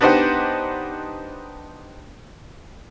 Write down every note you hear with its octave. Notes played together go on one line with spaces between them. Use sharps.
B3 D4 D#4 G4 C5 F#5